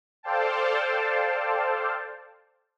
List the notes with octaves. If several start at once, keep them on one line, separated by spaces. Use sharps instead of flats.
A4 C5 D5 F5 G5 A5